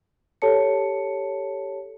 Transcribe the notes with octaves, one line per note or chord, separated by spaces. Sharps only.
G4 A4 C#5 A5 C#7